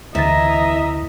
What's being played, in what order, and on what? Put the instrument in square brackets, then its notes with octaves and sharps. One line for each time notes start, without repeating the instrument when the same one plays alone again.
[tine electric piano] D2 D3 A6 [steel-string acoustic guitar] E3 [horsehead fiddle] D#5 A#5 [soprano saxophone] E5